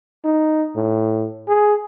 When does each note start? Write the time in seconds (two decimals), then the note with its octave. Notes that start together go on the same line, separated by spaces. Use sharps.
0.24 D#4
0.76 A2
1.48 G#4